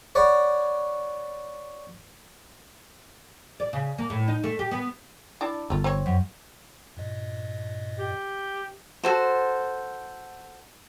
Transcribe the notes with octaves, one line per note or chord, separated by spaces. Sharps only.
C#5 D5 F#5 B5
D5
C#3
A#3
A2
D#4
A3
G4
B3
D4 E4 D5
G1 A3 F4
C4 C#5
F#2
G2 A#2 D#5
G4
F#4 A4 C5